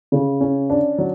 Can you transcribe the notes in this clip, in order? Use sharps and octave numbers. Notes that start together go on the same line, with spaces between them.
C#3
C#4
D4
F#3